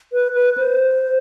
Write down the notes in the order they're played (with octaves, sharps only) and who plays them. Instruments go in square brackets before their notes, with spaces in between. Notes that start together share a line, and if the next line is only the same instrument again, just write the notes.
[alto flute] B4
B4
C5